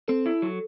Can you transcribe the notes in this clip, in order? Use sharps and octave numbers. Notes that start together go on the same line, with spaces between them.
C4 A4
E4
F#3